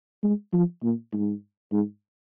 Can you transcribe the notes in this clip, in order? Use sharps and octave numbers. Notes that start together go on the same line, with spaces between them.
G#3
F3
A#2
G#2
G#2